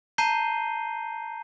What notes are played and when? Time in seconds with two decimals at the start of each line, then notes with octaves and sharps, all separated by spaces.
0.18 A5 A#5 G6 C7 D#7 G7